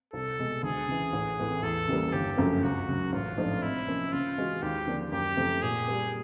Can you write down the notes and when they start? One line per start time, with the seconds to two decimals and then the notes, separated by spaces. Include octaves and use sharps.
0.13 C2 A4
0.39 B2 G#3
0.63 D2 G#4
0.88 C#3 E3
1.13 A1
1.39 A2 E3 A3 C4
1.62 E2 A4
1.88 C#3 E3 G3 A#3
2.13 G1 G4
2.38 F#2 C#3 F3 A3
2.63 C#2 F#4
2.88 C#3 F#3
3.12 A1 F4
3.38 G#2 F3 A3 D4
3.62 C3 E4
3.88 F3 A#3 C#4
4.13 C#3 F4
4.38 E3 G#3 C#4 F#4
4.62 D#2 G4
4.87 D3 F3 A#3 D4
5.12 F#2 G4
5.37 C#3 F3 A3 C4
5.62 A#2 G#4
5.88 G3 A#3